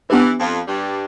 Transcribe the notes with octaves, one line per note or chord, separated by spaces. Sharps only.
E3 B3 D4 G4 B4
F2 F3
G2 G3